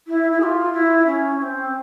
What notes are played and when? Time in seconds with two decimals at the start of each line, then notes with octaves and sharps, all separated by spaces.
0.07 E4
0.32 E4
0.40 G#4
0.43 F4
0.73 E4
1.06 C#4
1.39 C#4
1.42 C4